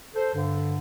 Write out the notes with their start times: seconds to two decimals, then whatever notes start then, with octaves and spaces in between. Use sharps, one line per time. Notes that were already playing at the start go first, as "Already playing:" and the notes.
0.15 A4 C5
0.34 G2 D3